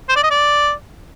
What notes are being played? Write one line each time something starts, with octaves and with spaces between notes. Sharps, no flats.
C5
D5
D#5
D5